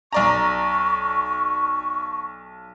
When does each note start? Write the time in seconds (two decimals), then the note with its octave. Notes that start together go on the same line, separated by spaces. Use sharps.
0.13 B1 D5 A#5 C#6